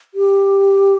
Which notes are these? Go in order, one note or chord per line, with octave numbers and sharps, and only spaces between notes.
G4